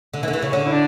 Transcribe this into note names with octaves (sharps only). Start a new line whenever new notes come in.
D3
E3
D3
E3
C#3
D3 C#4
E4
D4